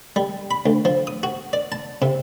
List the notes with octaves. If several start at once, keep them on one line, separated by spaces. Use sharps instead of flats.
G3
B5
D2
F3
D#6
F#4
D5
A5
C3